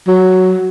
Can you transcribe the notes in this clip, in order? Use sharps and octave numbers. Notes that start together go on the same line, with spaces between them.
F#3